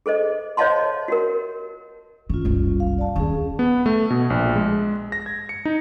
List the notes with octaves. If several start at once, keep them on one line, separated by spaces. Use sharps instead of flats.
G#4 A4 C5 D#5
C5 C#5 D#5 F5 A5 C6
F#4 G4 A#4
D#3 C#4 F4
F#1 C2
F5
D5 A5
D#2 D#3 C#4 G#4
B3
A3
B2
A#1
G#3
A#6
G#6
C#7
D#4